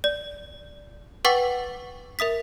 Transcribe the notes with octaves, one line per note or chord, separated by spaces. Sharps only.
D5
B4 F#5 G5 C#6 D6 A6
A#4 E5 D#6 B6